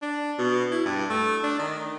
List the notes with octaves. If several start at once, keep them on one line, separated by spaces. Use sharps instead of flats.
D4
B2
E4
G2
A3
D4
D#3